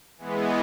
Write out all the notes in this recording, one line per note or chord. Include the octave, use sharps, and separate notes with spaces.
E3 G#3 B3